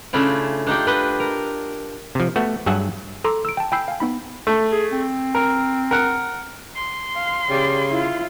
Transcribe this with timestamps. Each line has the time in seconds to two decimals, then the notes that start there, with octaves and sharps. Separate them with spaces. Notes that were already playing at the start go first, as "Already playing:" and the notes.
0.13 C#3 A3 C#4 D4 E4 F4
0.67 D4 D#4 F4 G4
0.87 D4 B4 D#5
1.20 A#4
2.15 C3 F3
2.36 A3 B3 F#4
2.66 G2 F#3 G#4 E5 F#5
3.24 A4 A#5 C6 D6 E6
3.45 E6 D7
3.57 G5 A5
3.72 G5 G#5 B5 E6 G6 C7
3.88 F5 G#5
4.00 B3 D#4 B5
4.47 A3
4.72 G#4
4.92 C4
5.35 A#4
5.91 A#4 F#5
6.76 C6
7.16 F5
7.50 C#3 G4 D5
7.90 E4 F4